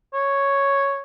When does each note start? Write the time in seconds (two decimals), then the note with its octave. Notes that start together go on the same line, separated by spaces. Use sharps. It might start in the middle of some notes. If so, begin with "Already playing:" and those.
0.14 C#5